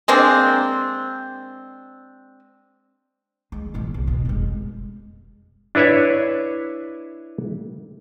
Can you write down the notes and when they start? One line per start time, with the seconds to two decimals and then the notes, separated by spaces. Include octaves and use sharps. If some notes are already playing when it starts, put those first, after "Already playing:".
0.08 G#3 A#3 C4 D4
3.52 G#3
3.74 B2 E3
3.94 C2
4.07 B2
4.25 F1 G#3
5.75 D4 E4 B4 C#5 E5